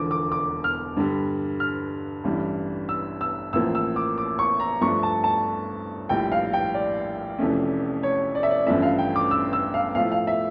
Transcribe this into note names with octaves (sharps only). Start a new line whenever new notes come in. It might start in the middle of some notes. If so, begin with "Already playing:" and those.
Already playing: E1 E2 D3 F3 D6
D6
D6
F6
G2 D3 G3
F6
A1 G2 E3 G3
E6
E6
A1 A2 F3 A#3 E6
E6
D6
D6
C#6
A#5
G2 F3 A3 D4 C#6
A5
A5
A#1 A2 G3 G5
F5
G5
D5
F1 F2 E3 A3 C#4
C#5
D5
E5
D5
A1 G2 F3 A3 C#4 E5
F5
G5
D6
E6
E6
F5
A2 F3 A3 F5
F5
E5